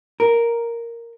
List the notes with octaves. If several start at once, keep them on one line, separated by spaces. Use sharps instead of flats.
A#4